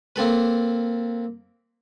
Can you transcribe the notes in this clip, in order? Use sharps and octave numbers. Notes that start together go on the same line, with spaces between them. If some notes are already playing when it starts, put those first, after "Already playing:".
A#3 C4 A4 B4